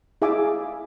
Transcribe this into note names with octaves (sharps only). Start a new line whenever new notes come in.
E4 G#4 E5 F5 G#5 D6